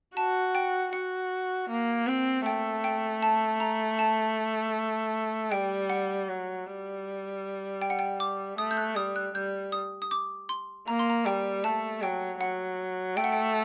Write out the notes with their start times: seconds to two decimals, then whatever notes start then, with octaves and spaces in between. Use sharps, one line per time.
0.17 F#4 A5
0.55 G5
0.93 F#4 F#5
1.69 A#3
2.07 C4
2.46 A3 G5
2.84 G5
3.23 A5
3.60 A#5
3.99 A5
5.51 G3 G5
5.90 F#5
6.28 F#3
6.67 G3
7.82 G5
7.90 F#5
7.99 G5
8.20 D6
8.58 A3 D#6
8.71 G6
8.77 F#6
8.96 G3 D#6
9.16 F#6
9.35 G3 G6
9.72 D#6
10.02 D#6
10.11 D6
10.49 C6
10.88 A#3 A#5
10.99 C6
11.10 A#5
11.26 G3 G5
11.64 A3 A5
12.02 F#3 G5
12.40 F#3 F#5
13.17 A3 G5
13.24 F#5
13.32 G5